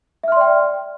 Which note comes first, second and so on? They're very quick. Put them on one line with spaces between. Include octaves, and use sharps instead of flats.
E5 F6 C6 D5 G5